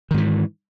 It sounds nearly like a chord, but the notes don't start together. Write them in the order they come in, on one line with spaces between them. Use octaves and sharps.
D#3 G#2 E3